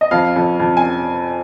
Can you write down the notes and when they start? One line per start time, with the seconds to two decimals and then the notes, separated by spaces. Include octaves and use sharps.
0.01 D#5
0.11 F2 F5
0.36 F2
0.60 F2
0.77 G#5